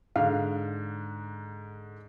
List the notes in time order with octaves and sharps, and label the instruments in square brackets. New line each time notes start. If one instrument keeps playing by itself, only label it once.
[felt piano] G#2 D3 [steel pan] F5